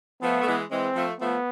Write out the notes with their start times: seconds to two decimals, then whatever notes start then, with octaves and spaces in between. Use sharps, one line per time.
0.22 F3 A3 B3
0.41 A3
0.46 E3 G#3
0.71 E3 G#3 C4
0.95 F3 A3
1.20 F3 A3 B3